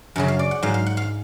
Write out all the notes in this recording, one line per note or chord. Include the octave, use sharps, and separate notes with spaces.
F#2 C#3 F#3 F#5
F5
D5
F#5
G#2 F#3 F5
F5
F#5
F5